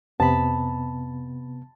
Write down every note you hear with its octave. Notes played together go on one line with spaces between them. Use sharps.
F2 C3 B3 A5 B5